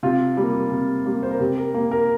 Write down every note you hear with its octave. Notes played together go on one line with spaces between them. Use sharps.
C3 F4
G3 A#3
C3
G3 A#3
C5
A#4
C3 G4
A#4
A#3
A#4